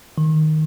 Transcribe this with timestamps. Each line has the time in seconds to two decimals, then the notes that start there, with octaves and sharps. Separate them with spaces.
0.18 D#3